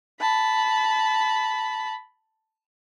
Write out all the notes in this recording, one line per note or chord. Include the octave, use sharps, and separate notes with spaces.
A5 B5